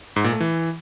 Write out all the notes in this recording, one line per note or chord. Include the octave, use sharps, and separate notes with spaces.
G#2
A#2
A3
E3